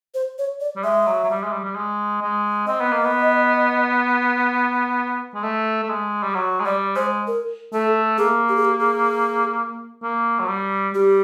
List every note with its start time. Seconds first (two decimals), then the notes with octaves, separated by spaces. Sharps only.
0.14 C5
0.38 C#5
0.60 D5
0.76 G3
0.84 G#3 E5
1.07 F#3
1.24 F#3
1.30 G3
1.43 G#3
1.53 G3
1.64 G3
1.76 G#3
2.22 G#3
2.67 C4 D#5
2.80 B3
2.92 A#3
3.06 B3
5.35 G#3
5.43 A3
5.83 A3
5.89 G#3
6.23 G3
6.34 F#3
6.60 G#3
6.65 G3 D5
6.96 G#3 C5
7.27 A#4
7.73 A3 A4
8.18 A#3 G#4
8.49 G4
8.56 G#4
8.65 G4
8.80 G#4
10.03 A#3
10.39 F#3
10.48 G3
10.94 G3 G4